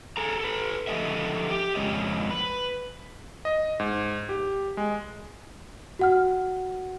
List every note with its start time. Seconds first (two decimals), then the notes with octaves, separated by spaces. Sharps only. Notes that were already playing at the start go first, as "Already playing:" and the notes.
0.17 G#4 A4 A#5
0.40 A4 B4
0.87 D3 F3 A4 D#5 E5
1.50 G4
1.75 F2 G#3 C#5 D#5
2.30 B4
3.45 D#5
3.80 G#2
4.29 G4
4.77 G#3
5.99 F#4 F#5 F6